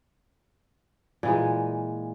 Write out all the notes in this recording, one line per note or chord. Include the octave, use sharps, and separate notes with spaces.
A#2 E3 G#3